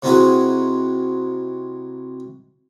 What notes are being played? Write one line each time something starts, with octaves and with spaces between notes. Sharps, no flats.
C3 C4 D#4 E4 F#4 G#4